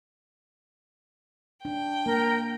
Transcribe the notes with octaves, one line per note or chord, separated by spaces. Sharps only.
D4 G5
A#3 A#4